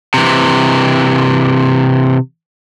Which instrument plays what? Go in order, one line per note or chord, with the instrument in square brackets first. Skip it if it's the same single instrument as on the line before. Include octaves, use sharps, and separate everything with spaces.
[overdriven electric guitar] C3 E3